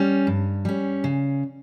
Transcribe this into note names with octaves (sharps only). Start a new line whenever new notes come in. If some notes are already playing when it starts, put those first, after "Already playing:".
Already playing: G3 C#4
G2
G3 C#4
C#3